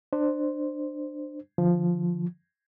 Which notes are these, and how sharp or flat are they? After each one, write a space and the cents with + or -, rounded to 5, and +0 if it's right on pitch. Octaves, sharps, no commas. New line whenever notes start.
D4 +25 C5 +0
D3 +25 F3 +0